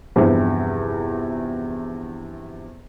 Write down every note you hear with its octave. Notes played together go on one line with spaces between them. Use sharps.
E2 G2 C3 F3